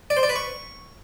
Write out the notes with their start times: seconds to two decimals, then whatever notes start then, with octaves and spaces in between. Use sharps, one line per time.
0.10 D5
0.17 C5
0.23 D5
0.29 B4
0.36 C#6